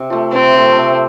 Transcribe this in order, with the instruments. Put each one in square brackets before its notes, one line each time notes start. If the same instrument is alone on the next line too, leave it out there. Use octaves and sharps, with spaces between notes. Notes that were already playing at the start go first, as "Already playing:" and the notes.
Already playing: [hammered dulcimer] C3
F3 A3
[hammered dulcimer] C3 [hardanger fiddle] C4
[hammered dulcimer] F3 A3
C3